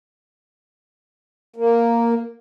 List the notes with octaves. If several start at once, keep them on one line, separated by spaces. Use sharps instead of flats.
A#3